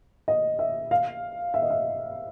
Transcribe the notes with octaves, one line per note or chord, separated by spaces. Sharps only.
D#5
E5
F5
E5
D#5
E5